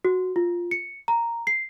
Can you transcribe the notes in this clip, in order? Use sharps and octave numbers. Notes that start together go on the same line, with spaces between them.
F#4
F4
C#7
A#5
C7